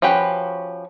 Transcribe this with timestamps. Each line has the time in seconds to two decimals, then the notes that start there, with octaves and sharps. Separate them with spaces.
0.02 F3 C#4 F#4 G4 B4